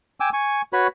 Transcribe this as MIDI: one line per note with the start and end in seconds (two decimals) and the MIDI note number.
0.20 0.29 79
0.20 0.29 80
0.20 0.29 86
0.20 0.29 88
0.33 0.62 80
0.33 0.62 85
0.73 0.87 66
0.73 0.87 71
0.73 0.87 73
0.73 0.87 83